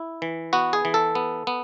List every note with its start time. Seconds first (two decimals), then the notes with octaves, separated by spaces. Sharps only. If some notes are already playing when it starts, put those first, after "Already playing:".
Already playing: E4
0.22 E3
0.53 B3 F#4
0.73 G#4
0.85 E3
0.94 A4
1.15 B3
1.47 B3